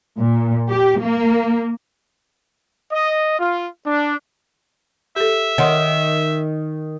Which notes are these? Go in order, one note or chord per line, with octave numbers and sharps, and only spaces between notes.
A#2
G4
A#3
D#5
F4
D4
G4 A4 E5
D#3 C#5 F#5 C6